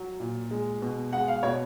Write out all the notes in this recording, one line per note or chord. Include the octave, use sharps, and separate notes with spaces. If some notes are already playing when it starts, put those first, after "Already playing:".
Already playing: F#3
A#2
G#3
B2
G#3 F#5
F5
B2 C#5